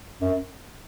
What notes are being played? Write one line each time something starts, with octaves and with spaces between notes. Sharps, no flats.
F#2